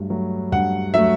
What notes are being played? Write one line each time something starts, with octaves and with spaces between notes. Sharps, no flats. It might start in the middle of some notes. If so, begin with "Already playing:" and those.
Already playing: G2 F#3 A3
F#3 A3
G2 F#5
F#3 A3 E5